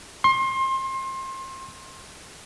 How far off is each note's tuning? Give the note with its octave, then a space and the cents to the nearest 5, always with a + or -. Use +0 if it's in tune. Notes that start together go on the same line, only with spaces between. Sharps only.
C6 +30